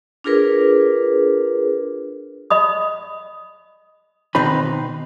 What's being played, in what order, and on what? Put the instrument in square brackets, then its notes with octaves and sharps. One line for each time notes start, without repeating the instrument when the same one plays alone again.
[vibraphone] D4 F4 G#4 A#4 B4
[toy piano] D#5 B5 D#6
[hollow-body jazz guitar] B2 D#3 C4 D#4 B4 B5